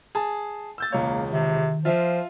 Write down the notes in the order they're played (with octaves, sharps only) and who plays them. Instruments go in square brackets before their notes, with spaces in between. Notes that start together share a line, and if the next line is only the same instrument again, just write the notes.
[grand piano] G#4 A5
E6 G6 A6
[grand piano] E1 C#2 C#5 [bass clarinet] A#3
[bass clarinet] C3 [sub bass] D#3
[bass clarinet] F3 [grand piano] F4 E5 F5